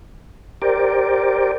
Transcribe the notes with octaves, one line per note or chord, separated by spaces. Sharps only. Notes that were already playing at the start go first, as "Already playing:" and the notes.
G4 A#4 C5 D5